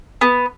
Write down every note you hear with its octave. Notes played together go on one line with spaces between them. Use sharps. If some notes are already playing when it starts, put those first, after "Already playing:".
B3